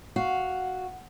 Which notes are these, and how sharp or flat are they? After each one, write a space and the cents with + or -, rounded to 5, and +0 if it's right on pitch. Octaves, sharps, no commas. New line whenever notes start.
F#4 +0 F5 +0